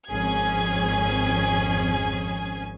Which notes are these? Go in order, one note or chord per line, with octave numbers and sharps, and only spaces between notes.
G#1 F2 C#4 G#4 G#5 G#6